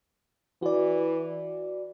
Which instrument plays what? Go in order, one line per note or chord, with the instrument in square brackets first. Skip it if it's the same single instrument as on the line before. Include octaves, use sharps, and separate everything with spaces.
[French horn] E3 [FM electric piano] F#4 D5